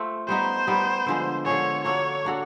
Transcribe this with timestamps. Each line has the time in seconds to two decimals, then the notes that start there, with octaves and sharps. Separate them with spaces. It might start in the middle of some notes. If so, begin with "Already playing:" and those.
Already playing: A3 C4 F4
0.28 G3 B3 D#4 C5
0.67 G3 B3 D#4
1.06 D3 F3 G#3
1.46 D3 F3 G#3 C#5
1.84 A#3 D4 F#4 A4 C#5
2.25 A#3 D4 F#4 A4